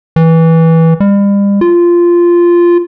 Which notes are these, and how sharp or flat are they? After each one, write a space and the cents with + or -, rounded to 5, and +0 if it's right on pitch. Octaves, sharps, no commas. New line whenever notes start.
E3 -15
G3 +40
F4 -10